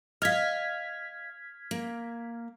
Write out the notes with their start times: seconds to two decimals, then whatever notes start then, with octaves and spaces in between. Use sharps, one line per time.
0.22 D#5 F5 F6 G#6 B6
1.71 A#3